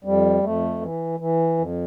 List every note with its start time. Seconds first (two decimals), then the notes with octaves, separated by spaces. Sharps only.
0.05 F2 G3
0.43 F2 A3
0.81 E3
1.20 E3
1.58 F2